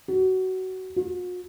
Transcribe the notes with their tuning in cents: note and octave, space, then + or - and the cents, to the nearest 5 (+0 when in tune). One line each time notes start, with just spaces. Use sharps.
F#4 +20
F#4 -45